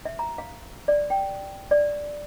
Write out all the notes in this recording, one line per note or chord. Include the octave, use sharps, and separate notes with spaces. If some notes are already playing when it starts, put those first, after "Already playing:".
E5
A#5
F5
D5
G5
D5